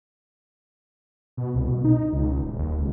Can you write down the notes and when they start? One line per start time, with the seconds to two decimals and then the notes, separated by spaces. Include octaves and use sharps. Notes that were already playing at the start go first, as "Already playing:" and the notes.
1.37 B2
1.55 C2
1.68 B2
1.85 D#4
2.13 C#2
2.31 C#2
2.43 D#1
2.59 D#2
2.78 C#2